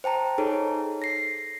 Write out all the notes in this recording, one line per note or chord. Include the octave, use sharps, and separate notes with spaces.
C5 G5 A5 A#5
D#4 G#4 A4 C#5
A#6 C7